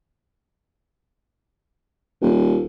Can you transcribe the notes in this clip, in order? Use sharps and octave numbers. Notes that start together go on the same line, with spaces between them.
D#1